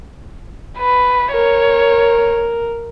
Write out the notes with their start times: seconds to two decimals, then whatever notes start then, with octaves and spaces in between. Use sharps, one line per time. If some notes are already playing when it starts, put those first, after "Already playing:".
0.78 B4
1.33 A#4 C#5